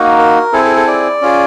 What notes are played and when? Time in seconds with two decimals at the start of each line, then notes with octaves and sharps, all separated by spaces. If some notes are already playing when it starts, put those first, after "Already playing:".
Already playing: A#3 D#4 F#4
0.19 A#4
0.53 C4 E4 G#4 A4
0.65 A4
0.76 A4
0.87 D5
1.22 C#4 F4 G#4